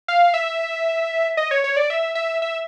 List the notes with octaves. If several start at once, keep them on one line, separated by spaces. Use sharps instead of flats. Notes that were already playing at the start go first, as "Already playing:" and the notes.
F5
E5
D#5
C#5
C#5
D5
E5
E5
E5